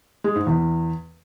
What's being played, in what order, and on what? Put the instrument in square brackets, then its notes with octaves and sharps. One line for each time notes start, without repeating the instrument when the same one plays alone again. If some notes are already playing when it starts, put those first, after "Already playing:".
[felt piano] G#3
G#2
E2